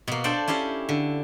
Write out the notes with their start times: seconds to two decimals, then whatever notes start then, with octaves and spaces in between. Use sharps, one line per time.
0.08 B2 A#3
0.24 D4 A4 C5 D5 G5
0.48 C#4 E4 G4 F5
0.89 D3